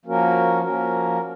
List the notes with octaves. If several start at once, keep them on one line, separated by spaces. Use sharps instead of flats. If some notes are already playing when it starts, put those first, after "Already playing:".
F3 A#3 C#4 F#4 A#4
F3 A#3 C#4 F#4 A#4